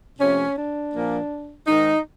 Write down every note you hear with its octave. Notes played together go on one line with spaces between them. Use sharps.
C3 F3 A3 C#4
D4
A#2 F3 A#3
G#2 D#3 G#3 D#4